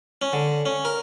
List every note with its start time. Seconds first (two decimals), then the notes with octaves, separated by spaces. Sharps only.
0.22 C#4
0.33 D3
0.66 C#4
0.85 A#4